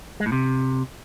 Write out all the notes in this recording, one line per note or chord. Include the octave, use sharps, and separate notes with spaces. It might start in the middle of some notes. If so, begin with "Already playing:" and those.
G#3
A2
C3